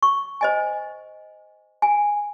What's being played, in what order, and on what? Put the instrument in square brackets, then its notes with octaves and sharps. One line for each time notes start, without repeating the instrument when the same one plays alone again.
[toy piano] C#6
C5 D#5 G#5
G#5